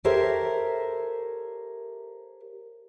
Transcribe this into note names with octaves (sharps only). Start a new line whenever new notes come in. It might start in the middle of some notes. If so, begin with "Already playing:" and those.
G4 A4 A#4 C5 C#5 E5